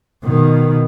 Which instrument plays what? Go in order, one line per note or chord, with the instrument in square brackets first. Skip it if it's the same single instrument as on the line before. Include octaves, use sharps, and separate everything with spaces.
[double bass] B2 D#3